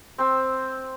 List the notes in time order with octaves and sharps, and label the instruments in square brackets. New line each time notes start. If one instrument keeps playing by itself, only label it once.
[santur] C4 C5 E6